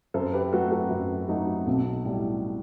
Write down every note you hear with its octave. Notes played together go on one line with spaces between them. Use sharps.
F#2 A4 C5
G4 B4
F#3 A3 F#4 A4
F#4 A4
F#2
F#3 A3 D#4 F#4
B1
A2 G3